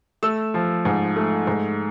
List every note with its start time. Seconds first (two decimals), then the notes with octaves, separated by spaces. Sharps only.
0.23 A3 E6
0.54 F3
0.85 G#2
1.16 A3
1.47 G#2